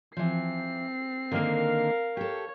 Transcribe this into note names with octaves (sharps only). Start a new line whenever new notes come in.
E3 F3 C4 C7
D3 D#3 A#3 A#4 F5
G4 A4 C#5